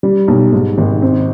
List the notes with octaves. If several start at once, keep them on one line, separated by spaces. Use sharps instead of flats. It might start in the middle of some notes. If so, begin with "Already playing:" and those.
G3
B1
G#2
G#1
C4